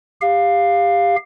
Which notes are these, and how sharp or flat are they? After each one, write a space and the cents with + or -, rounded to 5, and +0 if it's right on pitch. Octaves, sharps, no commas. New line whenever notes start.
G4 +25 F5 +0